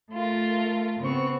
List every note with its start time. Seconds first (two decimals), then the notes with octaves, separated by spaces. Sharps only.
0.12 A3 F4 A#4
0.99 C#3 B3 C4 C#6